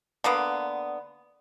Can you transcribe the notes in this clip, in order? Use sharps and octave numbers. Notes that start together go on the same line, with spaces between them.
D3 A#3 B3